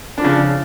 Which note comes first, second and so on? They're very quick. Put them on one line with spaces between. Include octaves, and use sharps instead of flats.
D4 F3 C#3